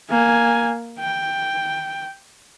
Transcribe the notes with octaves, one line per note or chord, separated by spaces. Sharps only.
A#3 G#5
G5